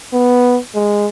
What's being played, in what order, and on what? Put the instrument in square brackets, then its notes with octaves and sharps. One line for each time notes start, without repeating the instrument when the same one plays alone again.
[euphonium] B3
G#3